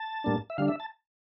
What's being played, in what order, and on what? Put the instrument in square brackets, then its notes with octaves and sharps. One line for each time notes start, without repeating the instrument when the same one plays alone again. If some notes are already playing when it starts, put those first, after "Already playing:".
Already playing: [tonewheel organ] A5
A2 G3 A#3 D4
E5
D3 G3 D4 F5
E5
A5